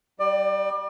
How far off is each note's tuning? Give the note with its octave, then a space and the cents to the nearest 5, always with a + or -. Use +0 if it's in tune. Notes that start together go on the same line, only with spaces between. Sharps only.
G3 -20 D5 +30